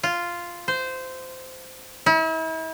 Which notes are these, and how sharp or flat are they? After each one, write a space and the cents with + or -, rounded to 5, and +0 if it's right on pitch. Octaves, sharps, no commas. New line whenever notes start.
F4 -5
C5 -15
E4 -40